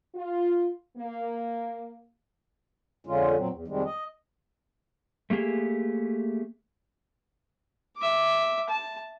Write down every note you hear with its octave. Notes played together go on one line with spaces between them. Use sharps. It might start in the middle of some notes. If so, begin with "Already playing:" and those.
F4
A#3
F2 D3 G#3 C#4 F4
A#2 F#3 C4
E2
F2 C3 D#3 G3 G#3
D#5
A3 A#3 G4 G#4
E5 D6
A5